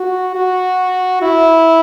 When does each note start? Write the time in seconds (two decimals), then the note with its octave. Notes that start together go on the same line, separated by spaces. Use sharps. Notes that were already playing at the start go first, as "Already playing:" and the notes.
Already playing: F#4
0.35 F#4
1.22 E4